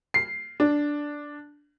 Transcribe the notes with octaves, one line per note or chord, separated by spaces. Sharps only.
C7
D4